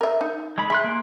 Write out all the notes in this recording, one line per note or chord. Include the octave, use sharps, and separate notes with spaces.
A#4 E5
D#4
G#3 A4 B5
G#4 E5 C6 F#6
A#3